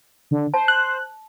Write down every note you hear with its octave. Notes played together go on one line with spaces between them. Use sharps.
D3
C5 A5
F#6